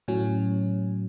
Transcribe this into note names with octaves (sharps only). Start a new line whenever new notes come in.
A2 F#3 C#4